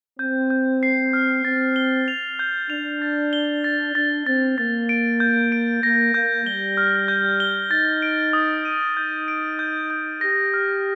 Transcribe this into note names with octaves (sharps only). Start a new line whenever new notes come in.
C4 G6
G6
C7
F6
C4 A6
G7
F7
G6
D4 F7
A6
G7
A6
D4 A6
C4 A6
A#3 A6
D7
G6
D7
A#3 A#6
A#3 G6
G3 G7
F6
G6
G7
D#4 A6
D7
D#6
D#7
D#4 G6
D7
G6
G6
G4 A#6
F6